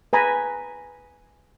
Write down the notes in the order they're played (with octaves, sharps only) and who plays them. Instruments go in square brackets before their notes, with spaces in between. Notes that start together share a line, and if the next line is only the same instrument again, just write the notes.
[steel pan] B4 G#5 A#5 B5